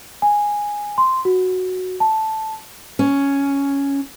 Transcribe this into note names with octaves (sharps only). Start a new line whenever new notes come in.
G#5
C6
F#4
A5
C#4